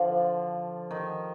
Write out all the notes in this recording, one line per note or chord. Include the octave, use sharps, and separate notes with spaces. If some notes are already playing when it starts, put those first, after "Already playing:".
Already playing: D3 F3
D#3